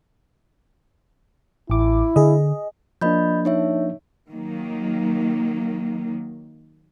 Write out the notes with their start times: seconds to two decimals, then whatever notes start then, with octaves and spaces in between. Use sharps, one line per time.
1.70 A1 E4 D6
2.16 D3 G#4 D#5
3.01 F3 A#3 D4 D#5 B5 G6
3.45 D#4 C#5 E5
4.30 D#3 F#3 A#3